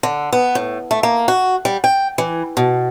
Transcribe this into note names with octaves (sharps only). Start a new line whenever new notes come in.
D3
B3
A2
A3
A#3
F#4
G3
G5
E3
B2